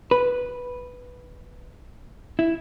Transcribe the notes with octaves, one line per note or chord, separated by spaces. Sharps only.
B4
E4